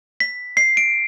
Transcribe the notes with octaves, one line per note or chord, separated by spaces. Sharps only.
B6
C7
D7